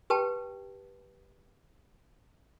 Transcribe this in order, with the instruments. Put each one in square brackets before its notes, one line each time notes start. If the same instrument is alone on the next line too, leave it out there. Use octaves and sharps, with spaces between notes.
[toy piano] G4 B4 G5 A5